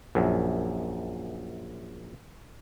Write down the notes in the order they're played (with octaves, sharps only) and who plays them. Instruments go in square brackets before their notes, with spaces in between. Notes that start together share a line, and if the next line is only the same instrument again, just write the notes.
[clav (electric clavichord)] A#1 F#2